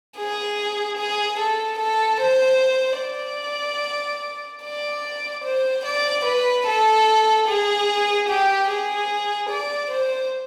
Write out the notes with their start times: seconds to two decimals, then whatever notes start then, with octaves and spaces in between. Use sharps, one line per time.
0.18 G#4
0.98 G#4
1.39 A4
1.79 A4
2.20 C5
3.01 D5
4.64 D5
5.44 C5
5.85 D5
6.25 B4
6.66 A4
7.48 G#4
8.29 G4
8.68 G#4
9.50 D5
9.91 C5